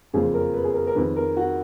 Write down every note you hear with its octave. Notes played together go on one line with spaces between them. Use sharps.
F#1 F2 F3 G#3 G#4
A#4
B4
G#4
A#4
A#4
F2 D#3 G#3 B4
A#4
F#4